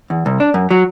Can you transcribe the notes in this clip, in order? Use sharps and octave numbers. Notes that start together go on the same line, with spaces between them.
E2
C2
D4
F#2
F#3